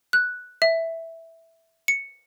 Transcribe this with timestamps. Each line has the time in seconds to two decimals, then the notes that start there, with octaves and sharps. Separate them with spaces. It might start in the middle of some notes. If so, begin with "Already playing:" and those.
0.13 F#6
0.62 E5
1.88 C#7